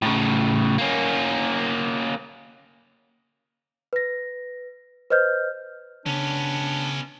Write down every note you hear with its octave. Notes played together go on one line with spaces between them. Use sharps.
A2 C#3
A#3 C#4
B4 A#6
B4 C5 D#5 F6 G6
C#3 B3 C#4 D4